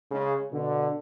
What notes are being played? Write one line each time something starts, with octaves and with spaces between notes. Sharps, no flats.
C#3 G#3
B2 D3